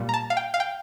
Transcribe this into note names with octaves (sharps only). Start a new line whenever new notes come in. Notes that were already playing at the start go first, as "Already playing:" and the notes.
Already playing: A#2 G3
A#5
A5
F5
G5
F5
G5